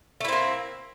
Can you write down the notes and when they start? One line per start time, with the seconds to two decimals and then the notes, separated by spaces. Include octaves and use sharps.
0.21 A3
0.25 E4
0.29 C4
0.32 A#3